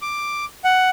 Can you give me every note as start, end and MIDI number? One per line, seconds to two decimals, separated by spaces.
0.02 0.45 86
0.64 0.90 78